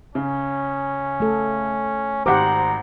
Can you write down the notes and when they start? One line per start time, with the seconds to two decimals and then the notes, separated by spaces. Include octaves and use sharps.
0.15 C#3 C#4
1.20 A3 A4
2.26 G#1 G4 C5 F#5 A#5 D6